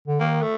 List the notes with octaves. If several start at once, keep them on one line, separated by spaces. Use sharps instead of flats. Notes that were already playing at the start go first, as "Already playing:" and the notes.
D3
D#3 A#3
A3